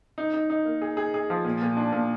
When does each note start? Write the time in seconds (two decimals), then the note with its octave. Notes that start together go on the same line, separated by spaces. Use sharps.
0.18 D#4
0.34 D#4
0.50 D#4
0.65 A#3
0.82 G#4
0.97 G#4
1.14 G#4
1.30 F3
1.45 A#2
1.62 A#2
1.77 D4
1.92 A#2